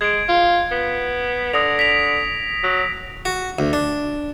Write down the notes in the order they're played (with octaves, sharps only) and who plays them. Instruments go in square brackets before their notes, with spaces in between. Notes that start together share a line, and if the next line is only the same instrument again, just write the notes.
[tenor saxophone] G#3 [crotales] G#6 D7
[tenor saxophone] F4
B3
[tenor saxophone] D3 [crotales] D#6 A#6 F7
[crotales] B6 D7 F7
[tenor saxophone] F#3
[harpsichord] F#4
D2
D4